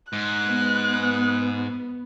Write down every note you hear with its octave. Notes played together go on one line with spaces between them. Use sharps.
G#2 F#6
B3